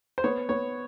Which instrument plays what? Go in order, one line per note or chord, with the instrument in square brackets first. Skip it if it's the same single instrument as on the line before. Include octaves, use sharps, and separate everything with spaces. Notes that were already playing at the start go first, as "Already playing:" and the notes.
[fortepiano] C5
[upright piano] B3 [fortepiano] C#5
[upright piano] B3 [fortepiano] C#5